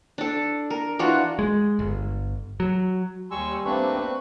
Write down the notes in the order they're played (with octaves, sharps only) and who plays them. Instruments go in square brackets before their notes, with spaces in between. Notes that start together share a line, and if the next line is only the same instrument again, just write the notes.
[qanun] D4 A4
A#4
E3 D4 F4 F#4
[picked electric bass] G#3
G1
F#3
[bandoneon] D#2 C#6 E6 [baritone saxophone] G3 [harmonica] G#5 C6
[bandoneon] A3 A#3 D4 [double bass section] C4 [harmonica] B4 C#6